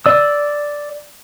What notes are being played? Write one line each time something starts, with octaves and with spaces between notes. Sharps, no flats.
D5 E6